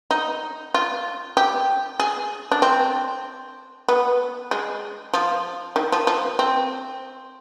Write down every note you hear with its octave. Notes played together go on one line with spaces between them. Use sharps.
D#4
F4
G4
G#4
D4
C4
B3
G#3
F3
D#3
F3
F3
C4